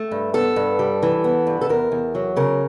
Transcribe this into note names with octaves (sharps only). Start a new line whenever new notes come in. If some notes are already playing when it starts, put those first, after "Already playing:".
Already playing: A3
G2
B3 A4
G2
G3
E3
B3
G2
A4
E2 A#4
E2
F#3
C#3 A#4